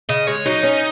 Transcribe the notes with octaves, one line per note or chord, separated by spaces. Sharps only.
C#3 D#5
G#3 C#5
F#3 D#4
C#4